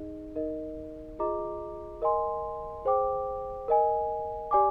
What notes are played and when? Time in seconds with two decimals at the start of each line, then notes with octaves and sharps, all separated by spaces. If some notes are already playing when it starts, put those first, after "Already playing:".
Already playing: D#4 G#4 D#5
0.36 D#4 A#4 D#5
1.19 F4 G#4 D#5 A#5 D6
2.02 A#4 D#5 G#5 C6
2.85 G#4 C5 G5 D6
3.68 A#4 D#5 G#5
4.51 G4 D5 G#5 D6